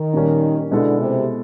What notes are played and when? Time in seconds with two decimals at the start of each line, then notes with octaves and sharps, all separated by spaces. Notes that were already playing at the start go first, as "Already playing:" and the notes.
Already playing: D#3
0.14 A#2 G3 A#3 C#4
0.71 B2 D3 G#3 B3 E4 A4
1.00 C3